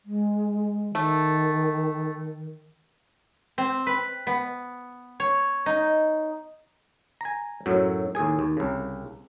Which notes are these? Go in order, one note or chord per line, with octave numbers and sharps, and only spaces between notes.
G#3
D#3 A3
C4
B4
B3
C#5
D#4
G#5 A#5
F#2 A2 F#3
D#2 A2 G#4 G#5
D#2
C2 C#3